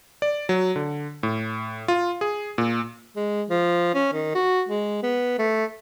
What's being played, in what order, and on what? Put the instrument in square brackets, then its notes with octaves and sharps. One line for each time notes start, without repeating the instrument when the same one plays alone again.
[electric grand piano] D5
F#3
D3
A2
F4
G#4
A#2
[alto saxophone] G#3
F3
C#4
D#3
F#4
G#3
B3
A3